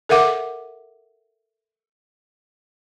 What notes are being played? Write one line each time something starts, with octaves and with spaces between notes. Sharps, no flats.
A4 A#4 E5 F#5 D6